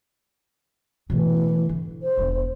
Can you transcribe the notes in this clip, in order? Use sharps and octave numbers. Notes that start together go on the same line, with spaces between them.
B2 E3 A3
D3
C5
E1 D4